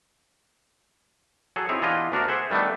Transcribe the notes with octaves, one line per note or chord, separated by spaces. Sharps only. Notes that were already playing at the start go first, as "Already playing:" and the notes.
F#3 G#4 A4
C4 D#4 E4 G#4 C#5
E3 B3 D4 F4 G4 D#5
D2 B3 D4 F#4 A#4
G#4 C5 E5 F#5
D#3 G3 A3 B3 D4